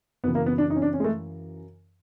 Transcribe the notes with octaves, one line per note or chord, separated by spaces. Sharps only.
F#2 C#3 E3 B3
A#3
B3
D4
D#4
C#4
D4
C#4
G#3
A3